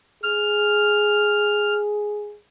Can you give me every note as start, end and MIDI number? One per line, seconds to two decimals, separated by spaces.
0.24 2.36 68
0.24 1.74 89